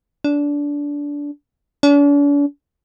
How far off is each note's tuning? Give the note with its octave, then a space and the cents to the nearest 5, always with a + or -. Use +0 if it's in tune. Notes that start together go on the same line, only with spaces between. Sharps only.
D4 -20
D4 -45